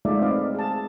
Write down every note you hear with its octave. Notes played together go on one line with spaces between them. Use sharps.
G#3 A3 D#4 F4 D5 E5
C4 B4 D5 D#5 F5
G#4 A5